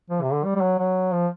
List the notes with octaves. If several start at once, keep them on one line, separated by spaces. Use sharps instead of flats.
F3
C3
D3
G3
G3
F#3
F#3
F3